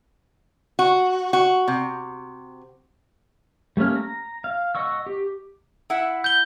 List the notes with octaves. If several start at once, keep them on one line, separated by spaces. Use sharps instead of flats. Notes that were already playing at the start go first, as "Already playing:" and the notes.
F#4
F#4
C3
G3 A3 A#3 C#4 F6
A#5
F5
D#5 F#5 C#6 E6
G4
E4 E5 F#5
G6 G7